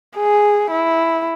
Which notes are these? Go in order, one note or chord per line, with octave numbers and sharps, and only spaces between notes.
G#4
E4